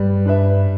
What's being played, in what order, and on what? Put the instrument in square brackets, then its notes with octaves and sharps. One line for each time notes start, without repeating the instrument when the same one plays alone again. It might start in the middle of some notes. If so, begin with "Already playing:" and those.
Already playing: [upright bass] G2 [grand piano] G3 B4
[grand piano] D4 B4 E5